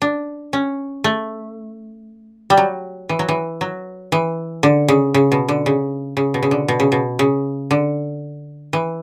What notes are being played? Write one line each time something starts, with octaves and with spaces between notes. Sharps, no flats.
D4
C#4
A3
G3
F#3
E3
F#3
E3
F#3
E3
D3
C#3
C#3
B2
D3
C#3
C#3
B2
C#3
D3
B2
C#3
B2
C#3
D3
E3